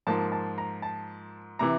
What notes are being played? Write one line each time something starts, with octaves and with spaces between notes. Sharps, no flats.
G#2 F3 A#3 A5
A5
A#5
A5
C3 E3 A#5